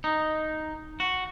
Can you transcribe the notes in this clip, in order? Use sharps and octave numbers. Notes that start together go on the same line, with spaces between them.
D#4
F#4